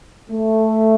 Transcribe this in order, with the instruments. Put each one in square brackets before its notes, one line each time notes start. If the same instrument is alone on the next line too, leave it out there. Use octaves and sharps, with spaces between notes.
[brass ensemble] A3